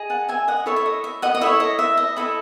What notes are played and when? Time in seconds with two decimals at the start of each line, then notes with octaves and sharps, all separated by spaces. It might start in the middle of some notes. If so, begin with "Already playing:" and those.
Already playing: G#4 D#5
0.10 F#5 A5
0.28 E5 G#5
0.48 D#5 F#5
0.66 E4 A4 C#5 E5
0.76 E5
0.86 D#5
1.04 E5
1.22 D#5 F#5
1.35 D#5
1.41 E4 A4 C#5 E5
1.60 D#5
1.79 E5
1.97 D#5
2.17 E4 A4 D#5 E5